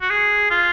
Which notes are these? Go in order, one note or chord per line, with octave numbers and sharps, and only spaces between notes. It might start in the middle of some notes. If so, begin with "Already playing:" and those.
F#4
G#4
F4